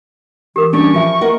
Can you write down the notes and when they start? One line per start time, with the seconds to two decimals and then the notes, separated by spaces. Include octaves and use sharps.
0.56 E3 G4 A#4 D6
0.73 G3 C#4 D4 C#6
0.94 F3 F4 E5 G#5
1.21 A#3 A#4 D#5 F#5